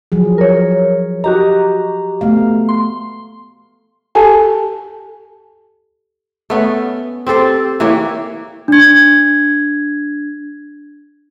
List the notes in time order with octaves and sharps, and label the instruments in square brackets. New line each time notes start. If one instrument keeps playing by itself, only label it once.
[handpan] F3 F#3 G#4
[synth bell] A#4 C#5
[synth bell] F#4 G4 A#5 [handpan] D#5
[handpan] A3 B3 F5
[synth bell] C6
[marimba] G4 A4 G#5 A5
[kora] A3 B3 C#4
C4 G4 A4 C5
E3 A#3 G4 C#5
[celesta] D4 G#6